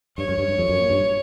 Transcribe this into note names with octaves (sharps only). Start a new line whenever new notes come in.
G2 C#5
F#2
G2
G2
F2
F#2
A#2
G2